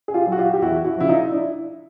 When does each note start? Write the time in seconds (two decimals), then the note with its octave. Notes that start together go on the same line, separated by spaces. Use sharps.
0.08 G#4
0.14 F4 G4
0.27 F#3
0.32 F#4
0.38 F4 G4
0.54 G4
0.62 E2 E4 F#4
0.85 E4 F#4
0.97 C#3 F3 E4
1.08 D#4 F4
1.32 D4 E4